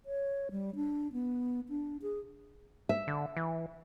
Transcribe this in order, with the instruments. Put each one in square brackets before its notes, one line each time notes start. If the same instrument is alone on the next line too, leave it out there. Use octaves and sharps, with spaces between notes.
[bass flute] C#5
G3
D4
B3
D4
G#4
[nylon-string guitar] E5
[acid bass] D3
E3